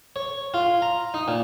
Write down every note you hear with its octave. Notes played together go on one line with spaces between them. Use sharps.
C#5
F4
A#5
D#4
A#2